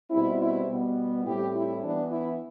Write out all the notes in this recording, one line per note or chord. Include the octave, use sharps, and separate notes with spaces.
B2 G3 C4 E4
E4
B2 G3 B3
A2 G3 C4 E4 G4
E4
E3 B3 D4
E4